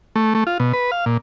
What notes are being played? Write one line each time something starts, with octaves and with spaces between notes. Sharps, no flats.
A3
A3
F4
B2
B4
F5
A#2